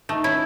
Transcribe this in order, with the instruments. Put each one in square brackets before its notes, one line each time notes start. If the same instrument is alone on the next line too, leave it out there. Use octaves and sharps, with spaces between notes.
[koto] A3 [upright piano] D#4
[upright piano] C#4 [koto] E4